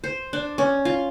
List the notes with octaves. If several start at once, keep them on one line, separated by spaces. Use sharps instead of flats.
C5
D4
C#4
F4